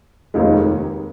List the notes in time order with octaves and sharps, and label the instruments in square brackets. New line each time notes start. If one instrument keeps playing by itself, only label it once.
[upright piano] F1 D#2 D#3 G#3